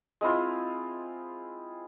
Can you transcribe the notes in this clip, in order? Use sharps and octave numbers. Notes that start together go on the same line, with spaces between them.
G#3 C4 E4 F4